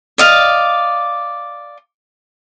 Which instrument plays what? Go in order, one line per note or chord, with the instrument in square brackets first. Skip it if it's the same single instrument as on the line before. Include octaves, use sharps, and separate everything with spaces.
[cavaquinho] D5 D#5 F5